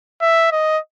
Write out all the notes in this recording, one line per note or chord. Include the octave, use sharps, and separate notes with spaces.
E5
D#5